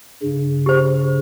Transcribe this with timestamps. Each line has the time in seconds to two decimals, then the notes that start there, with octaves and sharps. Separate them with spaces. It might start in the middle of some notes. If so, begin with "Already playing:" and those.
0.23 G2 C#3
0.66 G4 C5